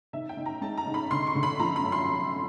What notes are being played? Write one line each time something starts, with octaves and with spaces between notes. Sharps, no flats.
D#3 E5
G5
D#3
A#5
G#2 A5
A#5
D#3
B5
D3 C6
C#6
D3
B5
F3 A#5
B5
F#2
C6